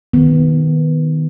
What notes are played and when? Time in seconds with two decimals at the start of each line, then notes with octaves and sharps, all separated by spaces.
0.13 D#3 B3